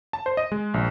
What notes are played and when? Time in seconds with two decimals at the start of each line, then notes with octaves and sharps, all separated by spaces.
0.13 A5
0.26 C5
0.37 D#5
0.52 G#3
0.74 A#1